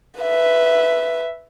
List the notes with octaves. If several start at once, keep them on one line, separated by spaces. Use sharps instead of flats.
B4 E5